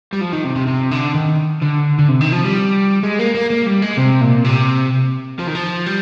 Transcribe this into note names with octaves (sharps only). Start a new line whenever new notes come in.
G3
F3
D#3
C3
C3
C3
D3
D#3
D3
D3
C3
D#3
F3
G3
G#3
A#3
A#3
A#3
G3
G#3
C3
A#2
C3
F3
D#3
F3
G3